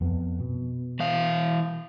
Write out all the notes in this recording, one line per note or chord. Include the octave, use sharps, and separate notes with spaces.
F2 B3
B2
E3 F5